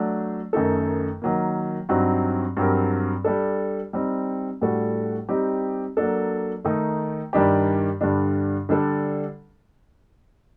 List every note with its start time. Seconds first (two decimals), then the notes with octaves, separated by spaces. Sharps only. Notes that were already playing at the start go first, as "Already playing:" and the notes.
Already playing: F#3 A3 D4
0.53 F#2 D#3 A3 D#4 A4
1.22 D#3 F#3 A#3
1.89 G2 F#3 C4 D#4 F#4
2.57 G2 F#3 C4 G4 A#4
3.24 G3 D4 A4
3.93 G3 C4 D#4
4.62 A2 G3 D4 F#4 A4
5.29 G3 C4 D#4 G4
5.97 F#3 A#3 D4 A4
6.65 D#3 A3 D#4
7.33 G2 D#3 G3 D4 G4
8.01 G2 D3 G3 D4
8.69 D3 G3 D4 A4